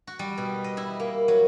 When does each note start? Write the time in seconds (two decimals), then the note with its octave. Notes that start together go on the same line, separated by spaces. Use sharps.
0.07 F#4
0.19 G3
0.38 B2
0.64 D#5
0.77 E4
1.00 A#3
1.28 F#3